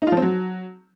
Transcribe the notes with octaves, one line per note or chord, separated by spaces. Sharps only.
D#4
F4
F3
C4
F#3